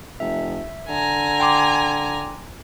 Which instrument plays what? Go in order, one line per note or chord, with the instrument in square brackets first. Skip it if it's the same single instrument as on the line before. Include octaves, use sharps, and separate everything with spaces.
[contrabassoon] F1 [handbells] E5
[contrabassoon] D3 [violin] G#5 A#5
[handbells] G5 C6 D6